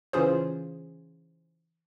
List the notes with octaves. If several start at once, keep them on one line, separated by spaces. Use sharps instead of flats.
C#3 E3 C#4 F4 G#4 C5